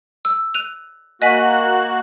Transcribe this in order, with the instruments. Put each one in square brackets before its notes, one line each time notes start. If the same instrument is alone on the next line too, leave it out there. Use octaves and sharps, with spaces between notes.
[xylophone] E6
F#6 D#7 F7
[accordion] A#3 F#4 F#6 [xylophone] D#5 G#5 B6